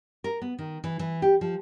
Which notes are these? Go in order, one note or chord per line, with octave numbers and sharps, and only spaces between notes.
A#4
B3
D#3
E3
E3
G4
F3